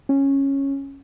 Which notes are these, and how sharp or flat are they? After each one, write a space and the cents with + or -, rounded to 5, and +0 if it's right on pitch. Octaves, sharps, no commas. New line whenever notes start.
C#4 -10